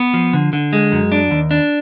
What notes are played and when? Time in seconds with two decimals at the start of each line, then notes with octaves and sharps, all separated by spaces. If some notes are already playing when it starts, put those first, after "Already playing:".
Already playing: B3
0.14 F3
0.33 D3
0.53 D3
0.73 G#3
0.92 F#2
1.12 D4
1.31 D#2
1.51 D4